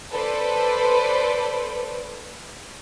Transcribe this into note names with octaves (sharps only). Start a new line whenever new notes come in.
A4 B4 C5 D5